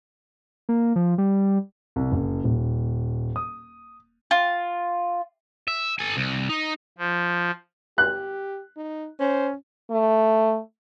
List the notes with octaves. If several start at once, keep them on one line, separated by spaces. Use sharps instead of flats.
A#3
F3
G3
C2
F#1
D#1
D#6
F4
E5
A4 G#5
C2
D#4
F3
G4 F#6
D#4
C#4 C5
A3